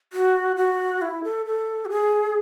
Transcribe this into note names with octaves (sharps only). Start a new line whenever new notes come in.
F#4
F#4
E4
A4
A4
F#4
G#4